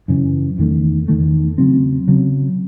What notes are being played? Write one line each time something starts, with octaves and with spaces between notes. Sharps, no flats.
F#2 C#3 E3
E2 D#3 A3
E2 D#3 A3
C#3 F#3 C4
C#3 F#3 C4